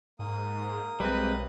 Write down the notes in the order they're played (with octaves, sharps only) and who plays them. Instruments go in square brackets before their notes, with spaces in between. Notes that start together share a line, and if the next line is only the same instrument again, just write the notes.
[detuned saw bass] G#2 [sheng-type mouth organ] A#3 D#6
[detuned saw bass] B1 [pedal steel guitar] G3 G#3 C4 [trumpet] B4